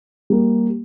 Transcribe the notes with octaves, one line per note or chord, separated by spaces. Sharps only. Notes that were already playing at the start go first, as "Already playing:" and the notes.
G3 A#3